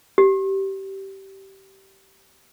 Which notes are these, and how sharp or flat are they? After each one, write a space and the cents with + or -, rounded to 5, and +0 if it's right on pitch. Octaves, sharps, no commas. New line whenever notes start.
G4 -20